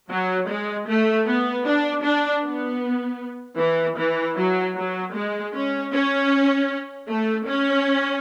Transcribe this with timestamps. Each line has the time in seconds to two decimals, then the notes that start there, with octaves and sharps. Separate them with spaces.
0.11 F#3
0.49 G#3
0.87 A3
1.27 B3
1.66 D4
2.04 D4
2.44 B3
3.59 E3
3.98 E3
4.37 F#3
4.76 F#3
5.14 G#3
5.53 C#4
5.93 C#4
7.09 A3
7.47 C#4